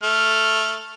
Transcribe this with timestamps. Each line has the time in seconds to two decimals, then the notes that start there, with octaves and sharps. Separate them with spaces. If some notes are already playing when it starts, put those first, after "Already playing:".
0.03 A3 F6